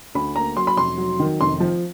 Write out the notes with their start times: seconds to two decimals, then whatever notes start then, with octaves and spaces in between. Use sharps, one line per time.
0.15 D2 B5
0.36 A#3 A#5
0.56 F#3 C6
0.67 B5
0.77 F1 C6
0.98 F#3
1.20 D#3
1.40 F1 C6
1.60 F3